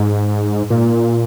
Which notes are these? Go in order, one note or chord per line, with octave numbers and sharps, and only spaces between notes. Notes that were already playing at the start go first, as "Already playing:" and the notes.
Already playing: G#2
A#2